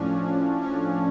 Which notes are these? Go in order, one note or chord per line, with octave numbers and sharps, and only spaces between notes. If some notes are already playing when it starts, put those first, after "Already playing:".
Already playing: A2 F3 C#4 D4
C#4
C#4